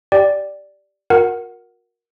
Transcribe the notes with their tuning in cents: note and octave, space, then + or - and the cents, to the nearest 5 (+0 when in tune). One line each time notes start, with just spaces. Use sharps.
G4 -5 D5 +0 G5 +0
F#4 -45 A#4 +10 F#5 +0